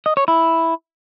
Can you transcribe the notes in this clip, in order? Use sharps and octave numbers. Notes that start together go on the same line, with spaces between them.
D#5
C#5
E4